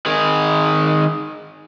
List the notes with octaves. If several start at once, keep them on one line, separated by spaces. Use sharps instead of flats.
D#3 G#4